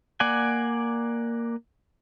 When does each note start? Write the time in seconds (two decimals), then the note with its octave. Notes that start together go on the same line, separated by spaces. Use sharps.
0.20 A#3 D5 F#5 G#5